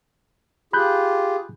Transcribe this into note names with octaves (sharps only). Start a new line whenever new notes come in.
F4 G4 G#4 B5 F#6 G6